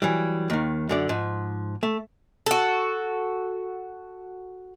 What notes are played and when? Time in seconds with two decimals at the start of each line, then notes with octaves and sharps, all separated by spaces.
0.02 E3 F#3 G3
0.50 D#2 D#3
0.89 F#2 D3 D5
1.09 G#2 F3
1.83 A3
2.46 F#4 A4